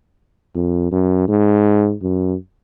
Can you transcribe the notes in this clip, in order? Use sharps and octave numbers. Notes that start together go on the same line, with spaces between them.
F2
F#2
G#2
F#2